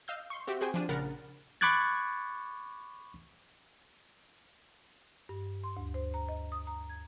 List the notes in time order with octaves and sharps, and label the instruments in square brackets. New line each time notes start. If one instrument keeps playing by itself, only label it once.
[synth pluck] D#5 F5 E6 G6
C6 C#6
C4 F#4 G4 E5
F#4 G#4 C5 G5 G#5
F3 D4 D#7
A#1 C#3 A#4 F#5 B5 A6
[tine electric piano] B5 C#6 D6 F#6 G#6 A6
[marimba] G2
C6
D2
C5
A#5
D#5
D#6
A#5
G#6